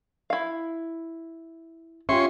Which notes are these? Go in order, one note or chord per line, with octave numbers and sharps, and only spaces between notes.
E4 F5
C#4 F4 G4 E5 C6 C#6